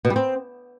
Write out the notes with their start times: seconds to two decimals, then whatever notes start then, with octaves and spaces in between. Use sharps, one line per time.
0.05 B2
0.10 G3
0.16 C4